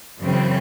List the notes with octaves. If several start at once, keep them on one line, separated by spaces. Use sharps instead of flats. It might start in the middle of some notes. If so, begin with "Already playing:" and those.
F#2 C#3 E3 C4